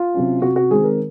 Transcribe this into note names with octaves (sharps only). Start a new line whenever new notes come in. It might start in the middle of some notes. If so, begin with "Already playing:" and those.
Already playing: F4
C3 F#3 C#4
C3 F#4
F#4
D#3 G#3 C4 G#4
A#4